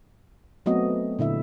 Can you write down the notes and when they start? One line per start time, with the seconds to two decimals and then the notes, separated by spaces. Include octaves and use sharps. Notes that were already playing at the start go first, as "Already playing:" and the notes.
0.66 F#3 A3 B3 C4 F#4 D#5
1.19 A#2 D3 E4 E5